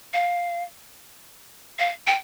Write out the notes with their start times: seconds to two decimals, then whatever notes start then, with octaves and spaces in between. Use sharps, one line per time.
0.14 F5
1.79 F5
2.07 G5